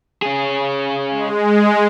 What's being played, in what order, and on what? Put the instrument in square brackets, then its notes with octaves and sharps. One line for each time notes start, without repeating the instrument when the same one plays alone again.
[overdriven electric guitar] C#4 G#4
[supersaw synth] G#3